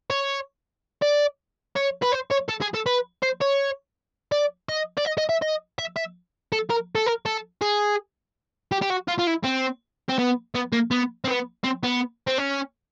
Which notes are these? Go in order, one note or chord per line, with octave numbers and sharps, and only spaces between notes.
C#5
D5
C#5
B4
C5
C#5
A4
G#4
A4
B4
C5
C#5
D5
D#5
D5
D#5
D#5
E5
D#5
E5
E5
A4
A#4
A4
A#4
A4
G#4
G4
G4
F#4
F4
F4
E4
C4
C4
B3
B3
A#3
B3
C4
B3
C4
B3
C4
C#4